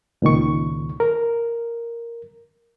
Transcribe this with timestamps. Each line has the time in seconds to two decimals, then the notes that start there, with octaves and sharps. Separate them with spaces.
0.22 C#2 A#2 D#3 C#6
1.00 A#4